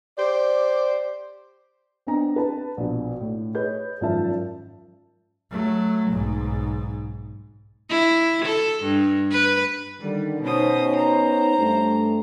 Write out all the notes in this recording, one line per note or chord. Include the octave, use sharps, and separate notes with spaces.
G4 C5 D5
B3 C4 D4 D#5 A#5
B4 A5
A#1 B2
A2
G#4 B4 C#5 D#5 G6
G#1 F#2 F3 F4 E5 A5
F#3 A3
B1 G#2
E4
A4
G2
B4
D3 D#3 G3
B2 B3 C#4 D#4 C5 D#6
C5 A#5
G2 A3